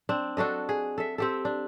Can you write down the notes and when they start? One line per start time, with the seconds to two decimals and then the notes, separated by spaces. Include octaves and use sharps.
0.09 C4 D4
0.37 D4 F#4 A4 D#5
0.69 G#4
0.98 A4 E5
1.18 C4 G4 A4
1.45 D4